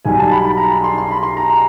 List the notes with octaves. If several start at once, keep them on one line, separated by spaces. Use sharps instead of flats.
B1 B2 G3 G#5
A5
B5
B5
A#5
B5
C6
C6
B5
C6
A#5
A#5